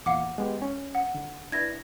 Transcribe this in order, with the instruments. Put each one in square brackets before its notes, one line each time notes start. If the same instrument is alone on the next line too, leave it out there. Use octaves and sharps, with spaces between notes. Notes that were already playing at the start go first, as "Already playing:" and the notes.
[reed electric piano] E2 A#2 [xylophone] F5 F#5 D6
[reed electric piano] G#3 B3 G4
C#4
[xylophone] F#5
[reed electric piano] D3
[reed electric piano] D4 E4 B4 [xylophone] G#6 A#6